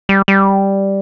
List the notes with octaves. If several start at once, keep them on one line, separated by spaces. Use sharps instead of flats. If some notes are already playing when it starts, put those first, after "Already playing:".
G3
G3